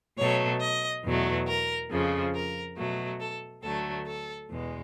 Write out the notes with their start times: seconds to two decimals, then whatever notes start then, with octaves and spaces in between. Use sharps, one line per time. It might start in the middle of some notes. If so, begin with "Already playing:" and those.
0.18 B2 F#3 A3 C#5
0.61 D#5
1.04 E2 B2 F#3 A3
1.47 A#4
1.90 F2 C#3 F3
2.34 A#4
2.77 B2 F#3 A3
3.20 A4
3.62 D2 D3 F#3 A3 A4
4.06 A4
4.49 E2 B2 G#3